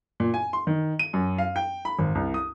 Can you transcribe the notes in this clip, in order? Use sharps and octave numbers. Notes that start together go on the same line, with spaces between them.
A#2
G#5
C6
D#3
D#7
F#2
F5
G5
B5
G#1
C2
D#6